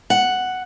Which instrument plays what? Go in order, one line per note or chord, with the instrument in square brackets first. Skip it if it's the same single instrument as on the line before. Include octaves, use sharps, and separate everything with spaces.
[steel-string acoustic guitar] F#5